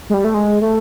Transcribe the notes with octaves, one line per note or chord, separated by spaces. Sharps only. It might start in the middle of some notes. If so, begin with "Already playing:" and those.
G#3
G3
A3
G#3
A3